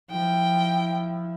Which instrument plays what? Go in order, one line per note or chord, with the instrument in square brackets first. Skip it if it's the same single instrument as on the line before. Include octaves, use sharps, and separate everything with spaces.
[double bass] F3 E4 [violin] G5